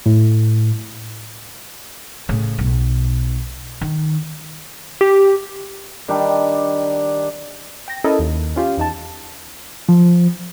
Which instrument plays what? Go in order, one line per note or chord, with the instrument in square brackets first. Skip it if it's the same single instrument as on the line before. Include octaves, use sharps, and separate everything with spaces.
[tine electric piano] A2
[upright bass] A2 C#3
B1
D#3
[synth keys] G4
[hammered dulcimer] D#3 G3 D4
[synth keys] G5 A#6
C#4 E4 A4 A#4 D#5
D#2
C#4 F4 G4
E2 D#4 A5
[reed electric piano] F3